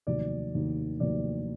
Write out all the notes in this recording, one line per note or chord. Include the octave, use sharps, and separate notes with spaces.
F1 D#2 D#3 F#3 D5
F1 D#2 D#3 F#3
F1 D#2 D#3 F#3 D5